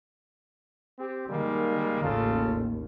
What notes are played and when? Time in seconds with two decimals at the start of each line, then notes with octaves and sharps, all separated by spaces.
0.99 C4 G4
1.29 D#3 G3 G#3 A#3
2.03 A1 D#2 C#3 F4 A4